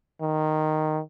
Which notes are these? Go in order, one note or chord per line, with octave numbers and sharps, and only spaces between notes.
D#3